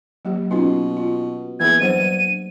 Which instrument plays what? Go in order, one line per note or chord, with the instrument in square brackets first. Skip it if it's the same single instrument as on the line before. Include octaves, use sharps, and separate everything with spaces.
[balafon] F#3 A#3 G4
[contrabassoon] B2 [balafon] C#4 D#4 F4
[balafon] F4
[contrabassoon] E3 [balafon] A#3 B3 G#4 [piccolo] G#6
[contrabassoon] G2 [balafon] F#3 C5 F#5 [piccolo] D#7